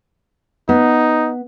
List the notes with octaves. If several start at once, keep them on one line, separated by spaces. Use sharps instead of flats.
B3 D#4